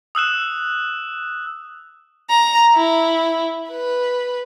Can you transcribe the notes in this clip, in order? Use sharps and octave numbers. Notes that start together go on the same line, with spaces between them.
D#6 E6 F#6 E7
A#5
E4
B4